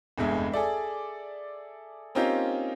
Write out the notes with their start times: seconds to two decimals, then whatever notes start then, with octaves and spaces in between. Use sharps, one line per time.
0.18 F1 E2 G2 G#3 E5
0.52 G#4 A4 D5 E5
2.15 A#3 C4 C#4 D#4 F4 G4